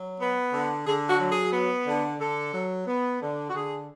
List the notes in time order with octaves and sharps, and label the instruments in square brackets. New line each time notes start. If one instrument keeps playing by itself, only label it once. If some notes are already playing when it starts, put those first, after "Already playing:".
Already playing: [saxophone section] F#3
B3
D3
D3 G#4
F#4
F#3
G#4
B3
D3
D3 A4
F#3
B3
D3
F#4
D3 G#4